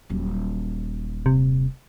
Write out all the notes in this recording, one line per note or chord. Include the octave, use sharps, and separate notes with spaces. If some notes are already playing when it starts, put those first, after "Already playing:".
D#1 F#3
C3